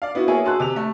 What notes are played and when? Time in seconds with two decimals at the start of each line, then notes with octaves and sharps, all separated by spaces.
0.02 D5 F5
0.15 B3 E4 F#4
0.28 A#3 B3 G#4 C#5 E5 G#5
0.44 F#4 G#4 A5 C6 E6 F#6
0.60 C3 F7
0.76 A3